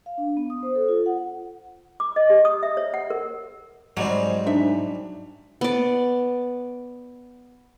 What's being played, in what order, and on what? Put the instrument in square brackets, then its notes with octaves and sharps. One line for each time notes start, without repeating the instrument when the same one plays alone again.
[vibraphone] F5
D4
B3
D#6
C5
A4
F4
F#5
[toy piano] D6
D#5
G4
D#6
E5
C#5
F#5
A#4
[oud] G#2 [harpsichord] F#3 G3 C4
[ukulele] D4 D#4 E5
[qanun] B3 D5